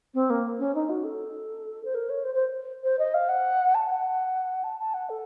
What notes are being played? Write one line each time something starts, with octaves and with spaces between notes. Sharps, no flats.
C4
A#3
C#4
D#4
F#4
A4
C5
A#4
C#5
C5
C5
C5
D#5
F5
F#5
A5
F#5
A5
A5
F#5
A4